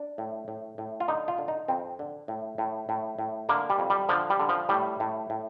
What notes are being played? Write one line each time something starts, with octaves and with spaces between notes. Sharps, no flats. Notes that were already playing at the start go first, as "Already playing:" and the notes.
Already playing: D4
A2
A2
A2
F4
D3 D#4
F4
D3
D#4
F2 C4
D3
A2
A2
A2
A2
D3 A#3
G3
F2
G3
D3 F3
G3
D3
F3
A2 G3
A2
A2